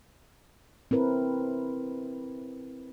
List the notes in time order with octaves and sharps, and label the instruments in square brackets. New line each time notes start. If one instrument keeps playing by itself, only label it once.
[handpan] C4 E4 A#4 B4